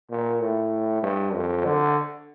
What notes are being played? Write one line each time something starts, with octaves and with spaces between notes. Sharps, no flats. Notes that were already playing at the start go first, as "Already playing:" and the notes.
A#2
A2
G2
F2
D3